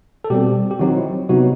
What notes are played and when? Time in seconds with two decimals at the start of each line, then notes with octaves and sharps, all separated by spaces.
0.24 A4
0.30 B2 G3 C4 G4
0.71 G4
0.79 D#3 F#3 C4 D#4 F#4
0.97 E4
1.29 C3 F#3 B3 D#4 F#4